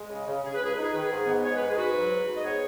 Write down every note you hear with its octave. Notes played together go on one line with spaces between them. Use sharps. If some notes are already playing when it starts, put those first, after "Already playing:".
Already playing: G#3
C#3
C#3
C#3 G#4
B4
C#2 G#4
D#4 B4
G#4
D#3 B4
G#4
G#2
B3
G#3 C#5
B4
G#2
G#4
G#2 F#4 B4
F#3
G#2
G#2
D#5
B3 G#4 C#5